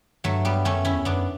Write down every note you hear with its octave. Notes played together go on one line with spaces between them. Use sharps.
G2 F#3 A3
G3 B3
F#2 A3 C#4
C#4 E4
E2
F#2 B3 D4